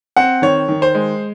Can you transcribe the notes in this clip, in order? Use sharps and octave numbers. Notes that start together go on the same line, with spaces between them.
C4 F#5
D#3 C#5
D#3
C5
G#3